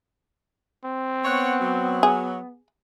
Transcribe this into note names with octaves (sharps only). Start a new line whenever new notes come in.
C4
B3 C#5 F#5
F#3
G#4